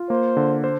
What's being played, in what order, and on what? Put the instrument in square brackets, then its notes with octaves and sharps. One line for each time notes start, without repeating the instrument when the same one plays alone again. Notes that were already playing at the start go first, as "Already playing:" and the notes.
Already playing: [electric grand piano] F4
[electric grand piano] A#3 [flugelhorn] C5
[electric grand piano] D3
C5